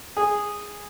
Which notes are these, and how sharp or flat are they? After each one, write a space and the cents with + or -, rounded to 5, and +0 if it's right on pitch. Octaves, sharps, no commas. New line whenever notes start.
G#4 -10